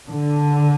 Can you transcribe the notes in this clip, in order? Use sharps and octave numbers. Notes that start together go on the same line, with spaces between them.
D3